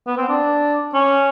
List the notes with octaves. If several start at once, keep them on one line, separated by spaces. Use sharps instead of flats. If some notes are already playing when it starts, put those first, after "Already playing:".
B3
C4
D4
C#4